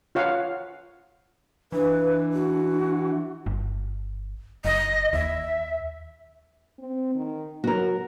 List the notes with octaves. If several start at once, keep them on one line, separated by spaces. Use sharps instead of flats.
F4 C#5 F5 F#5
E3 D4 B4
F#4
G1
F#1 D#5
D#2 E5
C4
D#3
F#3 F#4 A#4